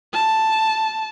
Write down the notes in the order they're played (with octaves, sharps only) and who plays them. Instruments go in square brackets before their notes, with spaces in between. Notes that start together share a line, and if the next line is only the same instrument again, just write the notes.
[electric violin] A5